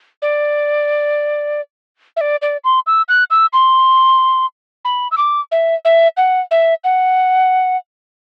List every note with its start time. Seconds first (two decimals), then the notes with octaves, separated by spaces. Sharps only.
0.22 D5
2.16 E5
2.21 D5
2.42 D5
2.64 C6
2.87 E6
3.08 F#6
3.30 E6
3.53 C6
4.85 B5
5.11 E6
5.18 D6
5.52 E5
5.85 E5
6.17 F#5
6.51 E5
6.84 F#5